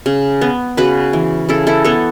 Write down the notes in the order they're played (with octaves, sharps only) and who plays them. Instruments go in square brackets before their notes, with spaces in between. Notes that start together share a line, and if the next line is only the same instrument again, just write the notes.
[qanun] C#3
B3
C#3 F#4 B4
E3
C#3 E4 A4
E4 A4
B3 A4 C#5